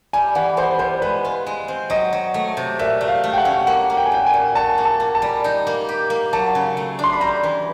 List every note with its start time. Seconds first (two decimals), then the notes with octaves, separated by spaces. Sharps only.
0.13 G3 G#5
0.35 E3 F#5
0.57 B3 C5
0.79 G3 C5
1.02 G#3 B4
1.25 F4
1.46 G#3
1.68 C4
1.90 F#3 D#5
2.13 F#3
2.34 A3
2.57 C3
2.79 A#2 E5
3.01 A3
3.08 F5
3.24 A3
3.33 G5
3.38 F#5
3.45 C#4
3.67 A#3 F#5
3.90 A#3
3.97 G5
4.06 G#5
4.12 A#2 G5
4.27 G#5
4.33 A#2
4.55 F#4 A5
4.78 A#3
4.85 A5
5.00 A#3
5.15 A5
5.22 G3
5.44 D#4
5.67 A#3
5.89 G4
6.10 A#3
6.33 F#3 A5
6.55 C#3
6.77 A3
6.99 D4
7.04 C6
7.13 B5
7.21 G3 A#5
7.43 E3